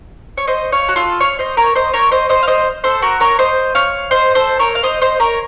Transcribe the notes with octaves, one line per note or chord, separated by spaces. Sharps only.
C#5
C5 D#5
C#5 F5
F#4
F4 A4
C#5 F5
C5 D#5
A#4 C#5
C5 D#5
A#4 C#5
C5 D#5
C5 D#5
F5
C5 D#5
A4 C5
F#4 A#4
A#4 C#5
C5 D#5
C#5 F5
C5 D#5
A4 C5
A#4 C#5
F5
C5 D#5
C5 D#5
A#4 C#5